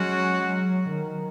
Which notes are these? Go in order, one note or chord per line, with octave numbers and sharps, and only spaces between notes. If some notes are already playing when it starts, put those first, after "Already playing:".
Already playing: F#3 G#3 C#4 F#4
F#3
D#3